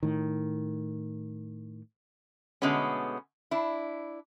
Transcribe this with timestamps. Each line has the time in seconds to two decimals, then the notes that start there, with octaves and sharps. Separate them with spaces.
0.03 A2 D#3
2.62 B2 D3 G#3 A3 B3 C#4
3.51 D4 E4